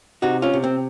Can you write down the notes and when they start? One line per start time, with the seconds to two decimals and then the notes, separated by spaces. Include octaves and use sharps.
0.22 C3 D#4 F#4
0.42 C#4 F4
0.53 C3
0.64 C4